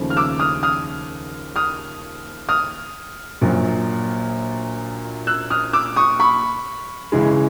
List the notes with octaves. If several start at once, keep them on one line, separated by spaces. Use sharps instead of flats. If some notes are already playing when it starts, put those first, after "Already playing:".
Already playing: D#2 C#3 F3 A3
F6
D6 E6
D#6 F6
D#6 F6
D#6 F6
D#6 F6
A#1 A#2 F#3
E6 F#6
D#6 F6
D6 E6
C#6 D#6
B5 C#6
C#2 C#3 E3 G#3